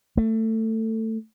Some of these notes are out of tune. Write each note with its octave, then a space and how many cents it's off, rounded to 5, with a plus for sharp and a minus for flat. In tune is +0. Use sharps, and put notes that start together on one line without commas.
A3 +20